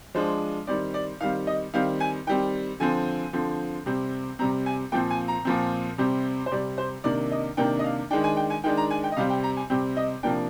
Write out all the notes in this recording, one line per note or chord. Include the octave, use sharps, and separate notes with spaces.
F3 G#3 D4 C5
D#3 G3 C4 D5
D5
D#3 G3 C4 F5
D#5
D#3 G3 C4 F5
G#5
D#3 G3 C4 G5
D3 F3 C4 G#5
D3 F3 C4
C3 G3 C4
C3 G3 C4 A#5
G#5
A#2 F3 C4 G5
G#5
A#5
A#2 F3 C4
C3 G3 C4
C5
C3 G3 C4 D5
C5
C3 D#3 A#3 D4 D5
D#5
C3 D#3 A#3 D4 G5
D#5
F5
D#3 G#3 D4 G5
G#5
G5
G#5
D#3 G#3 D4 G5
A#5
G#5
G5
D#5
C3 G3 C4 F5
G5
A#5
G#5
C3 G3 C4 G5
D#5
C3 F3 A#3 D4 G5